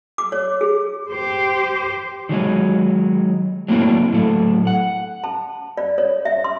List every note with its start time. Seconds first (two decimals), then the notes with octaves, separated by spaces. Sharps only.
0.18 D6
0.32 C#5
0.61 G#4
1.10 G4 C5
2.29 D#3 F#3 G#3 D#4
3.68 F#3 A3 A#3 C4 D4 E4
4.13 A2 F#3 A4
4.67 F#5
5.24 A5
5.77 D5
5.98 C#5
6.25 E5
6.44 C6